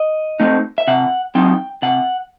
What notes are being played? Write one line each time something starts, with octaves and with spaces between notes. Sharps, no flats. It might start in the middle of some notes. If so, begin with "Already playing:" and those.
Already playing: D#5
A3 C4 D#4
E5
C3 F#5
F#3 C4 D#4 G5
C3 F#5